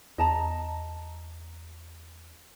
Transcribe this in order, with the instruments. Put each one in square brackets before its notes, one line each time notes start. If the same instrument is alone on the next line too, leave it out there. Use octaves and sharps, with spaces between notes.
[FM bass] E2 [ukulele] D#5 A5 A#5